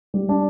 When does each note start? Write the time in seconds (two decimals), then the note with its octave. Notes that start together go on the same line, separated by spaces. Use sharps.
0.14 G3
0.29 D4